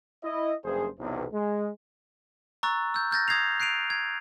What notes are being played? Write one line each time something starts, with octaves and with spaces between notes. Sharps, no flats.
E4 D#5
F#1 G2 G#4 C5
B1 E2 C3
G#3
A#5 C#6 E6 F#6 A6
E6 G6
F6 G6 A6 A#6
D#6 G#6 A#6 C7 F7
F#6 C7 D7 D#7 F7
G#6